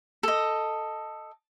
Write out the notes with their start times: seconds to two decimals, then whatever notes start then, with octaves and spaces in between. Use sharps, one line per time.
0.23 A4 D#5